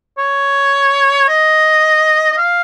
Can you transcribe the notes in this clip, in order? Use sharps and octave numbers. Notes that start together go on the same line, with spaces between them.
C#5
D#5
D#5
F5